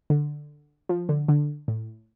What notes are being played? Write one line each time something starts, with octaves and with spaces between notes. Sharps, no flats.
D3
F3
D3
D3
A2